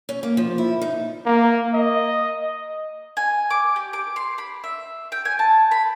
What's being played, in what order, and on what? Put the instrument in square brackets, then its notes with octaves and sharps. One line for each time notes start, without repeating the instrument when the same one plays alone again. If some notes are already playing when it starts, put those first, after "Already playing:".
[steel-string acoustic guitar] C#4
A#3
F3
E4
D#4
[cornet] A#3
D#5
[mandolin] G#5
D6
G4
D6
C6
B5
E5
G5
G#5
A5
B5